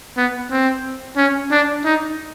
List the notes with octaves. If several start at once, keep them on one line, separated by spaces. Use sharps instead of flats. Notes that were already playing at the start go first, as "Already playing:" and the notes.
B3
C4
C#4
D4
D#4